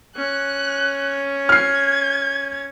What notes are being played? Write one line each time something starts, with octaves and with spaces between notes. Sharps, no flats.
C#4 F#6
F6 G#6 C7